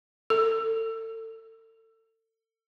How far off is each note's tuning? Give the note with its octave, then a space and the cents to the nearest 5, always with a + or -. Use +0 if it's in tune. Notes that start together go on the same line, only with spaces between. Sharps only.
A4 +30